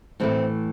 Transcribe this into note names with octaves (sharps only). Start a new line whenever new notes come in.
A2 E3 A3 C4